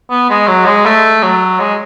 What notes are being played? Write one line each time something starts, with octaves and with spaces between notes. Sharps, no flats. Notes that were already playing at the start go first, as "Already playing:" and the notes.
B3
G#3
F#3
G#3
A3
F#3
G#3